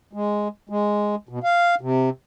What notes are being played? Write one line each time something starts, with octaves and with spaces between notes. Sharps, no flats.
G#3
G#3
B2
F5
C3